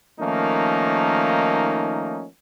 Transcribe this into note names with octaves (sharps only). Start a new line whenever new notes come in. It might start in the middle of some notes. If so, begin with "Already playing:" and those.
D#3 F3 A3 A#3 C#4 D#4